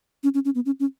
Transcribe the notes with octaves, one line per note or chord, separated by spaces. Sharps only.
C#4
C#4
C#4
B3
C#4
C#4